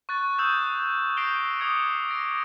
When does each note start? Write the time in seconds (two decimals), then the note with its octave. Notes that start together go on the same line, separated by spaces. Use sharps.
0.09 C#6 F#6 A6
0.38 D#6 E6 F#6 G6 E7
1.17 G6 A#6 C7 D7 F7 G7
1.60 D6 D#6 G#6 C#7
2.09 A#6 D7